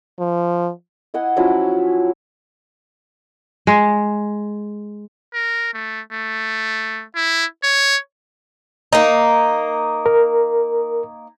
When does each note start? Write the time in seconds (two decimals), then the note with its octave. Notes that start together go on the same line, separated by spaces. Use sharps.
0.19 F3
1.14 E4 D#5 F#5 G#5
1.37 F3 F#3 C#4 E4
3.67 G#3
5.34 A#4
5.74 A3
6.13 A3
7.16 E4
7.63 C#5
8.93 A#3 D#4
10.06 A#4